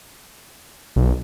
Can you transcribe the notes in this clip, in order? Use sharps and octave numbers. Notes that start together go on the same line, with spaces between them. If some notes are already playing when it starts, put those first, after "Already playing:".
B1